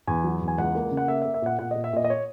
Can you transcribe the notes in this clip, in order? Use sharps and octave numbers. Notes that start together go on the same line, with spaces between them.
E2 G#5
F#3
E2
G#5
C#2 F#5
A#3
C#3
F#5
A#3 E5
A#3 E5
E5
A#2 F#5
A#2 F#5
D#5
A#2
E5
A#2 D#5
D#5
C#5